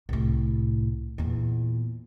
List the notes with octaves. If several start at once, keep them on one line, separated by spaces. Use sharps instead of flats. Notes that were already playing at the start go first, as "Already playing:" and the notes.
C2 A2
E2 A#2